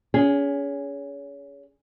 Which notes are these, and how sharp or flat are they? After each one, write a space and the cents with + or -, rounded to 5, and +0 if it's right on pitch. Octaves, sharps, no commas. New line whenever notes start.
C#4 +30 G#4 +0